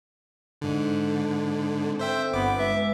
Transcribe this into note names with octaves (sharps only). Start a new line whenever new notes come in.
G#2 D3 A4
C4 A4
C5 E5 G5
G1 B3 D6
G#3 B4 E5